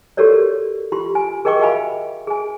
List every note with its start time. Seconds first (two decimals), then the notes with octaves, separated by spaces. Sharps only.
0.17 F#4 G4 A4 A#4 C#5 D5
0.92 F4 G4 C6
1.15 G#5
1.45 G#4 A#4 D#5 G5 C#6 D6
1.59 F#4 E5 F5 G#5 B5
2.27 G#4 G#5